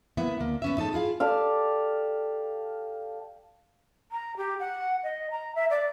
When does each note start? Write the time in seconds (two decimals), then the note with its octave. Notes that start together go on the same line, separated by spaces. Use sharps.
0.17 A#3 B3 E4 E5 F#5
0.40 D2 A#3
0.62 B3 C#4 E5
0.77 G#2 D#4 A4 A5
0.93 E4 F4 G#4 F5
1.20 G4 A4 D5 F5
4.12 A#5
4.37 G4
4.60 F#5
5.04 D#5
5.31 A#5
5.55 E5
5.70 D5